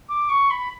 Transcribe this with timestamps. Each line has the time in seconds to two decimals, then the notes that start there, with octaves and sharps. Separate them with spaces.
0.09 D6
0.29 C#6
0.50 B5